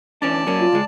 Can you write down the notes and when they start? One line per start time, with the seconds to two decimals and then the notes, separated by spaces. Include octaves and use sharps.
0.22 E3 C#4 D4 D5 A5
0.47 F#3 A#3 C#4
0.60 F4
0.72 C#2 G#3